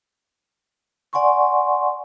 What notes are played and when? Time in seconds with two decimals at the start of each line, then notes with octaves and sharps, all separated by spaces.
1.13 D5 F#5 G#5 C6 C#6